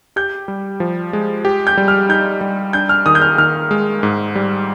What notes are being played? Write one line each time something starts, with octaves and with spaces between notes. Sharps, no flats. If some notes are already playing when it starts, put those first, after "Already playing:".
G4 G6
G3
F3
G#3
G4
G6
G3
F6
D#4 G6
G3
D4 G6
F6
D#3 D#6
G6
F6
D#3 F6
G#3
G#2
G3